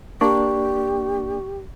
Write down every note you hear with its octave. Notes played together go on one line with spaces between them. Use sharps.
A#3 D4 G4 D5 C#6